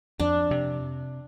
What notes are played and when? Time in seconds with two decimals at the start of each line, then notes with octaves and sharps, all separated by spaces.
0.20 F2 D4
0.51 C3